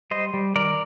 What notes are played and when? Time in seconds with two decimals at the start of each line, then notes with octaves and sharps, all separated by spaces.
0.11 G3 C5 D#5
0.34 G3
0.55 D#3 A#4 D5